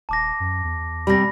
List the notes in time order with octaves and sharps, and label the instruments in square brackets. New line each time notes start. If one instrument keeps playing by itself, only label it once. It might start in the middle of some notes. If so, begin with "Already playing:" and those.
[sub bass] D#1 [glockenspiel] A5 D6 A#6
[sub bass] F#2
E2
[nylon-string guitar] C3 G3 [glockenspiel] B5 A#6